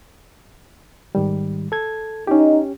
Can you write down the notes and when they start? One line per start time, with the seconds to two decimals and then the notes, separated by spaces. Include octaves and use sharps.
1.15 G#2 D#3 G3
1.72 A4 G#6
2.27 C#4 D#4 G4